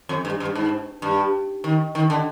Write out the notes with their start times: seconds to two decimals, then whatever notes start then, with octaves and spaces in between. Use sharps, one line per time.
0.09 F2
0.25 G2
0.40 G2
0.55 G#2
1.02 G2
1.64 D#3
1.95 D#3
2.10 D3